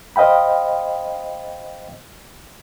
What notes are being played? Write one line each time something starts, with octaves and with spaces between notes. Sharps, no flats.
C5 D#5 F5 G5 B5